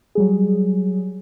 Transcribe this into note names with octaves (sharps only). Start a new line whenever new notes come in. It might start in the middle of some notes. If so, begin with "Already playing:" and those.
F#3 G3 G#4